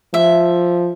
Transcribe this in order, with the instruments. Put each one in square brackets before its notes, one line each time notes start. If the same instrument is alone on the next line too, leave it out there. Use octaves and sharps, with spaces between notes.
[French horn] F3 [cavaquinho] E5